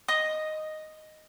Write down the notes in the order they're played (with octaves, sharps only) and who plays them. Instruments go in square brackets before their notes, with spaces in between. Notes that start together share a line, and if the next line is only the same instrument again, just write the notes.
[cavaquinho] D#5 D#6